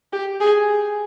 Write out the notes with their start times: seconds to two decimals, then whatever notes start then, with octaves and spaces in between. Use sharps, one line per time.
0.13 G4
0.40 G#4